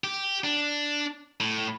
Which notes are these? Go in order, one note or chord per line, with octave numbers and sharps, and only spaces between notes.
G4
D4
A2